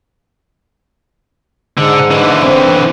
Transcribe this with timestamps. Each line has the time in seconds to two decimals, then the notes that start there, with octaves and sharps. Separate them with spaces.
1.78 G#2 D3
2.11 D3 E3
2.43 C4